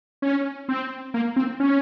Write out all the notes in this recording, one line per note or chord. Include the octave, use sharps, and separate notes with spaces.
C#4
C4
A#3
C4
C#4